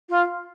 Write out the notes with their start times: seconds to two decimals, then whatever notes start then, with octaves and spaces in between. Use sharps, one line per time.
0.09 F4